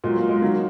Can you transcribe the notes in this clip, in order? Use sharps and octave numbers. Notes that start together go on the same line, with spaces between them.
A#2 F#3 G#3
A#3
G#3
D#3 F#3 A#3